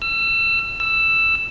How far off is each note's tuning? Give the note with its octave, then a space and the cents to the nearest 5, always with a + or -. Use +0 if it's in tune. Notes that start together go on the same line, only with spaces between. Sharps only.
E6 +30
E6 +10